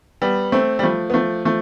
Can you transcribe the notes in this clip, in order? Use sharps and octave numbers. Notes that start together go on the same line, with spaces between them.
G3 B3
A3 C4
G3
F3 A3
B3
F3 A3
F3 A3